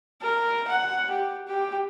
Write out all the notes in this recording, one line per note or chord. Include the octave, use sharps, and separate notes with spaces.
A#4
F#5
G4
G4